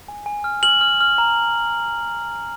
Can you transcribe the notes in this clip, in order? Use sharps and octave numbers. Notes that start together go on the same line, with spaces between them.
G#5
G#5
F6
F6 F#7
F6
F6
A#5